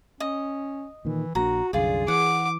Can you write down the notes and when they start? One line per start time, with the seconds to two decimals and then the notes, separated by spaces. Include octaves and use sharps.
0.20 C#4 D#5
1.05 A#2 D#3 E3
1.35 A#1 A#3 D4 F#4 A#5
1.73 C2 F#2 D3 F4 G#4 D5
2.08 E3 F#5 D6